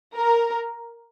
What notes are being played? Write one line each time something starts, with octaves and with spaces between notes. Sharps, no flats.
A#4